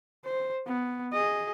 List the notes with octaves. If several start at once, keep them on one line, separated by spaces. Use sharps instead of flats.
C5
B3
G#4 D#5